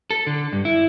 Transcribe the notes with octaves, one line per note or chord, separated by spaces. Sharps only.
A4
D3
G2
E4